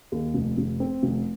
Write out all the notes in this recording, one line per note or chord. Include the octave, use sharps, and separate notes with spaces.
D#2
F1
F1
C4
F1